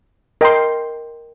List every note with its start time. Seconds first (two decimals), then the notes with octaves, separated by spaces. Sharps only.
0.41 A#4 D#5 G5 C6